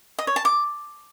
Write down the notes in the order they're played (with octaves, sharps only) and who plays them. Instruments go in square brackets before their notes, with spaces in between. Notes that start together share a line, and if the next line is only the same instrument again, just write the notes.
[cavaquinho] D#5
C#5
A5
D6